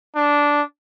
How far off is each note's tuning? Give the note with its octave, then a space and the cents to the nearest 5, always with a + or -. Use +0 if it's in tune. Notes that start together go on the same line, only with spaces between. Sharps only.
D4 -10